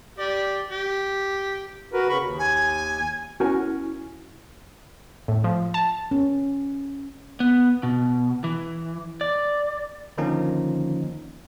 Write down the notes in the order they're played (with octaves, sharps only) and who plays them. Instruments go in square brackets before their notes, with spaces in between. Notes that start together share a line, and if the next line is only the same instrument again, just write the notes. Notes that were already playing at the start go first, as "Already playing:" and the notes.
[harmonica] G4 D5
G4
[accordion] F#4 A#4 B4
C#3 B5 C#6
D#2
[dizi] G#5
[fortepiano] C#4 A#4 G#5 [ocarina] E4 [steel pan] F#4
[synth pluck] A2
F3
A5
[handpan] C#4
[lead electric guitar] B3
B2
E3
D5
[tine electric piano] D3 D#3 F3 A#3 C#4 D#4